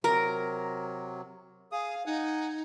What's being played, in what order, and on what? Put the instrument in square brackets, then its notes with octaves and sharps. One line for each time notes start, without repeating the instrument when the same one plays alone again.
[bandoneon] C3 F#3 [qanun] A#4 A#5
[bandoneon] G#4 D#6 [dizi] F5
[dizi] D#4 [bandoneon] F#5 G#5